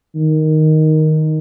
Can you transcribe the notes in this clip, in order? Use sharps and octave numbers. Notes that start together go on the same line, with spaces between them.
D#3